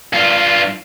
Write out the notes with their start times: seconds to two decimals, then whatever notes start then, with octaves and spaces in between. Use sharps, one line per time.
0.13 G2 F4